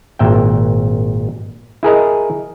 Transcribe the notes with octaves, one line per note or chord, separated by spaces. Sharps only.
G#1 A#2 E5 G5
E4 G#4 A#4 D#5